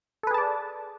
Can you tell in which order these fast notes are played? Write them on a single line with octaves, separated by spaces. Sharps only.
A4 B4 G#4 A5 D5